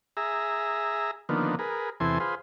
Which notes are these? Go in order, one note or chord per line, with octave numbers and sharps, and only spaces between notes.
G#4 E5 A#5
D3 D#3 F3 A#3 B3
G#4 A#4 B4
E2 C3 E3 A4 G#5 C6
F4 G#4 B4 C5